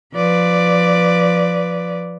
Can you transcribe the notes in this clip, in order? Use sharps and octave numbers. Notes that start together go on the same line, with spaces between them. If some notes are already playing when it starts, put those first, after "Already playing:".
F3 B4 D5